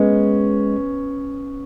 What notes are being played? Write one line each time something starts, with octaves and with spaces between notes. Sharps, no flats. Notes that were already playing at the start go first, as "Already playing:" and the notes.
Already playing: G#3 B3 C#4